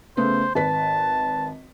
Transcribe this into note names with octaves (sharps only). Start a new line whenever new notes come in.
C#3 A3 B3 C5
G#1 B4 A5 B6